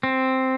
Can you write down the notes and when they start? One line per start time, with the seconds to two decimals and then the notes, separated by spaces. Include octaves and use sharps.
0.03 C4